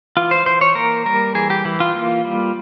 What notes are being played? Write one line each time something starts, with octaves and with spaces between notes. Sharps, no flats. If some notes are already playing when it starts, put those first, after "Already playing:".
E3 F4
C5
E3 C5
C#5
A#3 A#4
G3 A#4
E3 G#4
G4
E3
F4
A#3
G3